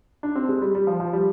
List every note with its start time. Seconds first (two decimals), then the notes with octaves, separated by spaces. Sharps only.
0.23 D4
0.35 C4
0.49 G#3
0.62 G3
0.75 G3
0.87 F3
1.00 F3
1.13 G3